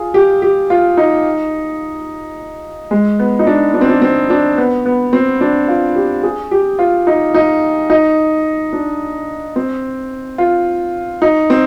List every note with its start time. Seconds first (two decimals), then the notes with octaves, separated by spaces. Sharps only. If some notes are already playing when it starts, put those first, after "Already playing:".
Already playing: F4 G#4
0.14 G4
0.42 G4
0.70 F4
0.97 D#4
2.91 G#3
3.19 B3
3.39 D#4
3.47 D4
3.74 D4
3.81 C4
3.89 D4
4.02 C4
4.30 D4
4.58 B3
4.86 B3
5.13 C4
5.41 D4
5.68 F4
5.96 G4
6.23 G#4
6.51 G4
6.79 F4
7.07 D#4
7.34 D#4
7.90 D#4
8.73 D4
9.56 C4
10.38 F4
11.22 D#4
11.50 C4